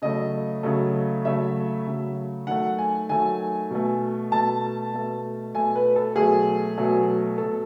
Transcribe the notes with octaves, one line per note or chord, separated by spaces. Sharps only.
C#3 F#3 A3 D#5
C#3 F#3 A3
C#3 F#3 A3 E5
C#3 F#3 A3
D#3 F#3 A3 F#5
G#5
D#3 F#3 A3 G#5
B2 A3
B2 A3 A5
B2 A3
B2 A3 G#5
B4
A4
B2 F#3 A3 G#4
B2 F#3 A3
B2 A3 A4